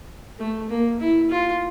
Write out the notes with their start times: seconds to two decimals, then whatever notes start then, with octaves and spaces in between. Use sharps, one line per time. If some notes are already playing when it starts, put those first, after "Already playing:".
0.39 A3
0.70 A#3
1.00 E4
1.30 F4